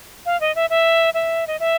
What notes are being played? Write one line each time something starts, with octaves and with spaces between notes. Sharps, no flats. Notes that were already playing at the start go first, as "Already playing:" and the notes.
F5
D#5
E5
E5
E5
D#5
E5